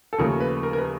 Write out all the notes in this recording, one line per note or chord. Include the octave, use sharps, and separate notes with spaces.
A4
D#2 C#3 F3 A3 A#4
B4
A#4
A#4
B4